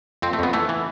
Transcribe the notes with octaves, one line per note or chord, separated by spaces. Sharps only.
F2 C4
A3
F2 B3
E3 A3
E3